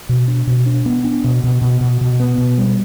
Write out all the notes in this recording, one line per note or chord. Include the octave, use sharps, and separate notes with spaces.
B2
D4
B2
D4
B3
D4
B2
B2
B2
B2
B2
B3
B2
G3